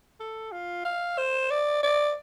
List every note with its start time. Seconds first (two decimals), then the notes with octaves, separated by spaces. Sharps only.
0.20 A4
0.52 F4
0.85 F5
1.18 C5
1.51 D5
1.83 D5